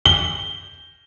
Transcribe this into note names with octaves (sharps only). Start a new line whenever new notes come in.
G7